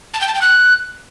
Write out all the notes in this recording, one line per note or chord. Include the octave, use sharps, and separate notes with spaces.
A5
G5
A5
G5
F#6